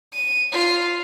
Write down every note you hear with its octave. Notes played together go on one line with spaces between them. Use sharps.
D#7
F4